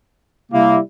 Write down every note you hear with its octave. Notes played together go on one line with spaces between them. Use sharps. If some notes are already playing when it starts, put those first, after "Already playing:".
C3 G3 A#3 E4